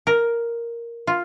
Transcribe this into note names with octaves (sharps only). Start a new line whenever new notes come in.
A#4
F4